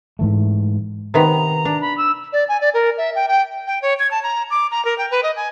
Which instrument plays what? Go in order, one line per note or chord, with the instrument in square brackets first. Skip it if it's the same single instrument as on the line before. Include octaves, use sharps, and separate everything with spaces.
[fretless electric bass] G#2 E3 A3
[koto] C3 D#3 B3 [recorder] A#5
[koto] D4
[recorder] B5
E6
[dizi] D5
G#5
D5
A#4
E5
G5
G5
G5
C#5
G#6
A5
A#5
D6
A#5
A#4
G5
B4
D#5
G#5